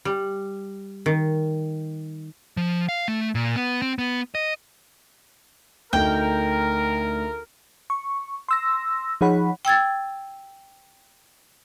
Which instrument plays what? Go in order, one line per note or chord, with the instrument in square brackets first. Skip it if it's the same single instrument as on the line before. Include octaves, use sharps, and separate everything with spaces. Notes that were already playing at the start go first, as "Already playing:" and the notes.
[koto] G3
D#3
[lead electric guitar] F3
F5
A3
A#2
B3
C4
B3
D#5
[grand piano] D2 D#4 [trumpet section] A#4 [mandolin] G5
[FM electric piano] C#6
C6 E6 A#6
F3 D#4 G#4 C#5 F#5 B5
[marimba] G5 E6 G#6 A6